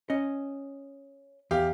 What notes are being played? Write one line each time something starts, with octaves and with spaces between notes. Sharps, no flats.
C#4 D#5
E2 G4 F5